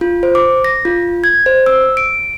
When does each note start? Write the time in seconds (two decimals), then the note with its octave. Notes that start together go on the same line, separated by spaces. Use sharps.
0.01 F4
0.23 C5
0.35 D6
0.64 A#6
0.85 F4
1.24 G#6
1.46 C5
1.66 E6
1.97 D7